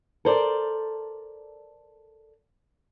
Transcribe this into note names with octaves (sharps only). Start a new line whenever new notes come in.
A4 A#4 C5 D5